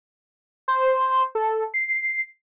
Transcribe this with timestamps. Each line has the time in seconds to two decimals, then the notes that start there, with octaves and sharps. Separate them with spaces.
0.68 C5
1.35 A4
1.74 C7